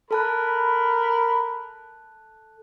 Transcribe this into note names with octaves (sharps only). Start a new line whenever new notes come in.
A4 A#4 A5 B5 F#6